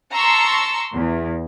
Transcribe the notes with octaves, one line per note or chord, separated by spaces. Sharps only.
A5 A#5 C6 C#6 E6
E2